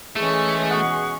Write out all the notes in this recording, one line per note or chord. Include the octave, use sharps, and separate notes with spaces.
E3 G#3 A3 C#4 G#4 C#5
B2 G#4 F#5 C#6